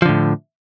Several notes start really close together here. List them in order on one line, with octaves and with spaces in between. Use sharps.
F3 D3 A2